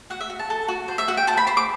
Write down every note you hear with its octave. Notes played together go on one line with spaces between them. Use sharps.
F#4 F#5
E5
F#4
A5
A4
F#4
C5
E5
F#4 F#5
G5
C5 A5
B5
C5 C6
D6